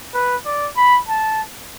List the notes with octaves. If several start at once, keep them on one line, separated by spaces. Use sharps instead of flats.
B4
D5
B5
A5